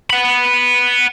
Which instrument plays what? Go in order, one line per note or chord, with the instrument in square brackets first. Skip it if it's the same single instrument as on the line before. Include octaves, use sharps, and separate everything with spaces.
[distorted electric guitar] F#5 B5